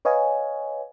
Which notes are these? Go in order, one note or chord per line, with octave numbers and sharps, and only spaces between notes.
B4 C#5 D#5 F5 G#5